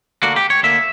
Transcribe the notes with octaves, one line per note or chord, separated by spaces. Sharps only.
D2 D3 A#3 F#4
G4
C#5
D2 D3 A#3 E5